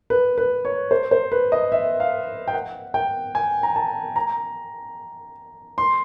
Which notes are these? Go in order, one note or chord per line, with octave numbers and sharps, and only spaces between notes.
B4
B4
C#5
C5
C5
B4
D#5
E5
F5
G5
F#5
G5
G#5
A#5
A5
A#5
C6